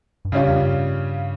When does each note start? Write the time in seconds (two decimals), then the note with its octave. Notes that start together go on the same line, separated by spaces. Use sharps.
0.25 G2
0.32 G#2 C#3 G3 C#4 F4
0.48 F2
0.63 G2